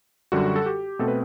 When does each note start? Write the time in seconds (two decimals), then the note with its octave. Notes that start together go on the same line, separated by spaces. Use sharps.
0.32 F#2 D3 G3 F#4
0.56 A4
0.66 G4
0.99 B2 A3 C4 A4
1.08 B4